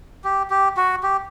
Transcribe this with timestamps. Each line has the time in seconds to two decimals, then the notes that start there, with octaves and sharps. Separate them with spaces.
0.24 G4
0.50 G4
0.77 F#4
1.03 G4